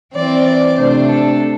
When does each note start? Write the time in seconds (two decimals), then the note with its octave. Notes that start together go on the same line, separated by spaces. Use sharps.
0.13 E3 C4 D5
0.45 D5
0.77 C3 A3 D4 C5
1.08 A4